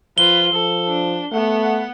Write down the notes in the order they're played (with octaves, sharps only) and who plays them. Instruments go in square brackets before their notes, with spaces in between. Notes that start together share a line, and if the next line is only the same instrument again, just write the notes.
[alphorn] F3 [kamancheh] F4 B4 [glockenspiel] G7
[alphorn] F3 [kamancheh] A4
[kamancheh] D4
[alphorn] A3 [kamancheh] B3 F#5